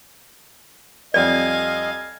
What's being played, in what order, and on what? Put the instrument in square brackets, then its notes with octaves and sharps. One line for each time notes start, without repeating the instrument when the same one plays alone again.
[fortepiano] F2 G3 [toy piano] D5 [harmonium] D#5 [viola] F5 G#5